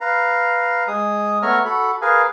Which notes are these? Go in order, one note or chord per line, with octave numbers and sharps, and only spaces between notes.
B4 F5 A#5
G#3 G#4 D#6
A3 B3 C#5 E5 A#5 F6
F#4 A4 B5
G#4 A#4 B4 F5 G#5